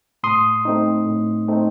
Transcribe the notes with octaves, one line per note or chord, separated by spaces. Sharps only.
A2 C6 D#6
A3 C4 D#4
A2
A3 C4 D#4